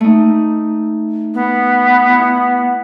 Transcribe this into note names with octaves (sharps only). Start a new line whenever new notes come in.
A3 D#4
B3
E4 F#5